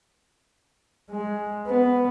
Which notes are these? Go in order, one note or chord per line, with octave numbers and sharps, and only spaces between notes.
G#3
B3